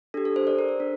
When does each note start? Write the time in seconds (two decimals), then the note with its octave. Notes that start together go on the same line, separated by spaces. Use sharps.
0.14 D4 G4 A4
0.25 A4
0.36 C5
0.47 D5
0.59 A#4
0.69 C5
0.80 D4